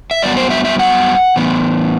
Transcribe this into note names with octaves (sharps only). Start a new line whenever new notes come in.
E5
G2 F#3 B3 D5
C5
E5
E5
F#5
A2 E3 B3